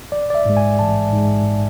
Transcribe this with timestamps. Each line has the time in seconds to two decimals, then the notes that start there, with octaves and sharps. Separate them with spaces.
0.12 A1 D5
0.30 D5
0.35 E5
0.45 G#2 G#3
0.57 G#5
0.79 A1 A5
1.13 G#2 G#3